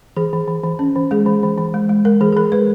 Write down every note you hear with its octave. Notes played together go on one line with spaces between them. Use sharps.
E3 G#4
E3
E3
E3
C#4
E3
G#3 G#4
E3
E3
E3
G#3
G#3
G#3 A#4
E3 G#4
G#4
E3 A#4
G#3 B4